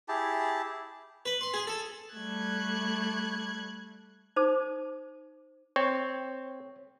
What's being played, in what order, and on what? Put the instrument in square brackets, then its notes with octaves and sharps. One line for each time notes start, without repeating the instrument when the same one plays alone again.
[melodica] E4 G4 G#4 A5
[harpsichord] B4
C6
G#4
A4
[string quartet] G3 A3 F#6 G#6
[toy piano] D#4 C5 A5 D6
[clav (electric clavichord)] C4 [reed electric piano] C#5